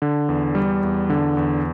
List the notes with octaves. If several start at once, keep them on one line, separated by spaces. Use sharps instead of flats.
D3
E2
G3
E2
D3
E2